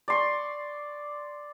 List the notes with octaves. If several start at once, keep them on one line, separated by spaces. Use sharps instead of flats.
D5 C6 C#6